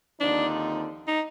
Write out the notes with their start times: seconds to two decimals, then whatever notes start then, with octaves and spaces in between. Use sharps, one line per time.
0.20 D#2 D3 F3 C4 D4 D#4
1.08 D#4